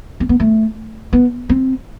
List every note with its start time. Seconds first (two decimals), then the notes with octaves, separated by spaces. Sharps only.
0.20 C4
0.29 B3
0.40 A3
1.13 B3
1.49 C4